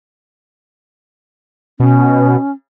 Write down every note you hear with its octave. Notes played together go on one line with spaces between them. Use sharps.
B2 C#4